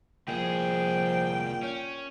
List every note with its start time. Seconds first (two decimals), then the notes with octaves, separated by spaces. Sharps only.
0.28 C2 A#2 F3 G#4 G5
1.63 C#4